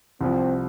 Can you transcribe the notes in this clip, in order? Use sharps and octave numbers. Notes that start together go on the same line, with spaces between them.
C2 C3 F3 C4